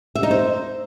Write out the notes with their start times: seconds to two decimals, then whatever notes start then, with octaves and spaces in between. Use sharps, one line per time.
0.15 E5
0.23 D#4
0.31 C5